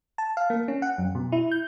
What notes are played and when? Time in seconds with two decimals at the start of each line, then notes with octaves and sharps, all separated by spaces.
0.18 A5
0.37 F5
0.50 A#3
0.68 C#4
0.82 F#5
0.98 F#2
1.15 B2
1.32 E4
1.51 G6